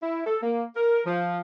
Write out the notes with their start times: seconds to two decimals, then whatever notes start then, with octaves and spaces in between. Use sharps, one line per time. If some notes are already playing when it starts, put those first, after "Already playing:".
0.02 E4
0.26 A4
0.42 A#3
0.76 A#4
1.06 F3